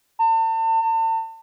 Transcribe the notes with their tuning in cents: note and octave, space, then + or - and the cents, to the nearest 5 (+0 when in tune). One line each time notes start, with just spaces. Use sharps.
A5 +40
A5 +40